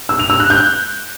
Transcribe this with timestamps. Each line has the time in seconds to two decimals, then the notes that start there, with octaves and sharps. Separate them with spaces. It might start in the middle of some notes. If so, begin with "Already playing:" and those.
0.09 E6
0.19 F7
0.30 E6
0.40 F#6
0.50 G6